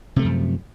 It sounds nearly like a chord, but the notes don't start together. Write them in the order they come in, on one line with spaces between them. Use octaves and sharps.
C3 A3 F3 F#2